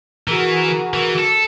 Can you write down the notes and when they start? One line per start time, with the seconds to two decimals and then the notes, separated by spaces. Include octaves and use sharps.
0.28 E3 F#4 G#4 A#4
0.94 E3
1.19 A4